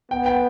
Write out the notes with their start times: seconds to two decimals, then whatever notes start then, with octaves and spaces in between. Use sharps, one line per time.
0.11 B3 G5
0.26 G5